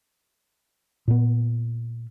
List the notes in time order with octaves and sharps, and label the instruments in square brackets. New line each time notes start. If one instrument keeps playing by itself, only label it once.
[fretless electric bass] A#2 B3